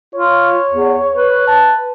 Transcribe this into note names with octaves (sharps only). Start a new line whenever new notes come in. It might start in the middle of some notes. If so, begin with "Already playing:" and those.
F4 C#5
E2
B4
A5